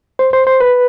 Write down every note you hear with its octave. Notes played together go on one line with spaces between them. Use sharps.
C5
C5
C5
B4